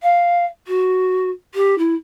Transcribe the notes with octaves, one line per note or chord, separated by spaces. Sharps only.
F5
F#4
G4
E4